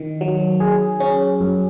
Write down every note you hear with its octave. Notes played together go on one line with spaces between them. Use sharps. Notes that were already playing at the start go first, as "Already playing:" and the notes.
Already playing: D#3
F#3
G#4
C#4
F#2